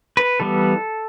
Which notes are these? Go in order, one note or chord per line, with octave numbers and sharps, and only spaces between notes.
B4
E3 G3 B3 A4